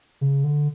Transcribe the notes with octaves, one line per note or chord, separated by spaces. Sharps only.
C#3
D3